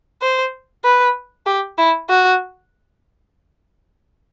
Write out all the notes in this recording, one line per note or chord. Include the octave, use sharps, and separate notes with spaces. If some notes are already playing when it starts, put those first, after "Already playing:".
C5
B4
G4
E4
F#4